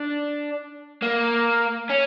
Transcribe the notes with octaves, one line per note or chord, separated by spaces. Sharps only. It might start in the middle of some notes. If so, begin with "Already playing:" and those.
Already playing: D4
A#3
C#4